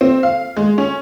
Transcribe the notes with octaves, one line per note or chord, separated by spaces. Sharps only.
C4
F5
G#3
C#4